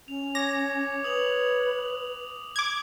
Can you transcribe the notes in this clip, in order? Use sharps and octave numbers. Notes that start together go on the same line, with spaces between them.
C#4 F7
C#5 D6 A#6
B4 D#6 F7 F#7
D6 G#6